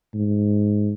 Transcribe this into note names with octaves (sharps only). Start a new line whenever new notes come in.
G#2